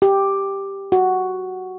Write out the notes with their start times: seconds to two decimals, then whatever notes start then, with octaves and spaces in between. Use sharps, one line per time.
0.02 G4
0.92 F#4